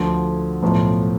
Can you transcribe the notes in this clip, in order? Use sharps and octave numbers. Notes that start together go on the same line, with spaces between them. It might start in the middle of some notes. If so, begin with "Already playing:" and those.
Already playing: D2 D3 F3
B1 A2 F3